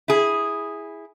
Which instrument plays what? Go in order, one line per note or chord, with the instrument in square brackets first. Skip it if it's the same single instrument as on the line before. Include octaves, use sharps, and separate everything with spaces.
[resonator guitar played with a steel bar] E4 G#4